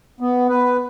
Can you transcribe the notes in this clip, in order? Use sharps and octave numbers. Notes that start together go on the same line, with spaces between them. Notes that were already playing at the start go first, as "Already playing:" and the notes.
B3
B4